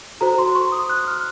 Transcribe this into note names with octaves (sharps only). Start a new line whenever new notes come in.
F#4 A4 C5 A#5
C6
C#6
D#6
F#6
F6